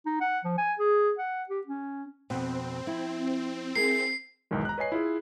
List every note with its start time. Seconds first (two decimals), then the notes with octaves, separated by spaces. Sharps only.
0.06 D#4
0.21 F#5
0.45 F3
0.58 G#5
0.79 G#4
1.18 F#5
1.49 G4
1.67 C#4
2.30 F2 B2 C4
2.86 F3 E4
3.76 E4 G#4 A#4 C7
4.51 B1 E2 G#2 D#3 G#3
4.65 A#5 F#6
4.78 B4 C#5 D#5 G#5 C7
4.92 E4 F4 G#4